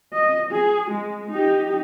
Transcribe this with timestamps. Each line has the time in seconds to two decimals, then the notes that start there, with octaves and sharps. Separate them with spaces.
0.13 D#5
0.51 G#4
0.91 G#3
1.31 D#4 G4